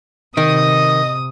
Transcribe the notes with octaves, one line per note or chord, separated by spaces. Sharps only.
C3 D#3 D#5 D#6